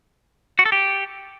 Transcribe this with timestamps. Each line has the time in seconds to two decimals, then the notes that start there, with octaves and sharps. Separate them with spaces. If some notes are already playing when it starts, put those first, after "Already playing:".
0.59 F#4
0.66 A4
0.72 G4